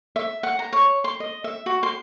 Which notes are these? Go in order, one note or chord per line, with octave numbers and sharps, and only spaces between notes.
E5
F#5
A#5
C#5
C6
D#5
E5
F#4
C6